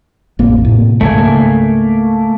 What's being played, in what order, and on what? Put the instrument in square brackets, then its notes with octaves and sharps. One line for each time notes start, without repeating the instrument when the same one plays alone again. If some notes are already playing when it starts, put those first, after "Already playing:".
[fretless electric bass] A1 F2 A#3
A2 C3
[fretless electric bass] C#2 G#2 C#3 [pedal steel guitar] A3 A#3 G#5